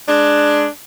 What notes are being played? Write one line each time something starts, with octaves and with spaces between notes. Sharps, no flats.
G#3 D4